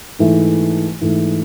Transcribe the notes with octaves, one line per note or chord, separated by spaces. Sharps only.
G#2 E3 A3
G#2 E3 A3